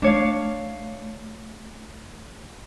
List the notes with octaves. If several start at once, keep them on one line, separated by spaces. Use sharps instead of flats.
A3 D4 C#5 F5